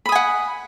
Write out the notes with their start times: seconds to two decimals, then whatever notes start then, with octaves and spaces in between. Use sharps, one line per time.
0.06 B5
0.09 D#6
0.12 G#5
0.16 F#5